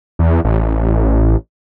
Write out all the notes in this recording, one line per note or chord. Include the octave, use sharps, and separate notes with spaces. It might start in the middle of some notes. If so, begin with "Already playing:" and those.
E2
A1